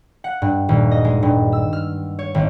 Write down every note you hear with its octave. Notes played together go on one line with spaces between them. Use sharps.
F#5
G2
D#1
D#5
G#3
G2
E6
F6
C#5
G#1